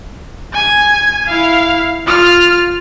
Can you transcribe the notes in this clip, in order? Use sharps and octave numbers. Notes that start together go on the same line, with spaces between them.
G#5 G#6
E4 F5
F4 F6